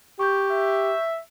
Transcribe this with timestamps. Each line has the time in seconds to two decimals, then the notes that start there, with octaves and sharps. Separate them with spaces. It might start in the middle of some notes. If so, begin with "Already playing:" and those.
0.19 G4 C#6 G6
0.52 E5